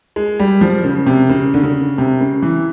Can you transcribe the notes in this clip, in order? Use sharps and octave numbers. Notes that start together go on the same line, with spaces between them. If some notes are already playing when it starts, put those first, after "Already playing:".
G#3
G3
F3
C#3
C3
C#3
D3
C#3
C3
C#3
E3